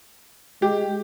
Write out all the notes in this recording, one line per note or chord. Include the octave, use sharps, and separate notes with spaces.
G#3 G4